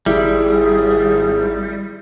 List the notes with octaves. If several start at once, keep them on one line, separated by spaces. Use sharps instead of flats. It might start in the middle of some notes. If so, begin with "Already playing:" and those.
G#1 G3 E4 G#4